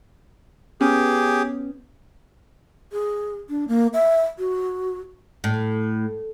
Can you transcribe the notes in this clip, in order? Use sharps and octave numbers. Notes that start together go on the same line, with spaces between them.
B3 C#4 G4 G#4
G#4
D4
A#3
E5
F#4
A2